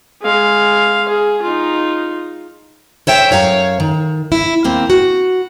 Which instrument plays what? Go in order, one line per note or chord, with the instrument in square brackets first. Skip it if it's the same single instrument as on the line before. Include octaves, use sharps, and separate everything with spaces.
[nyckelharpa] G#3 F5
G#4
D#4 F4
[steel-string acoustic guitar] C5 C#5 E5 G5
F#2 C#5 F5 A#5
D#3
E4
D#2 A#3 C4
F#4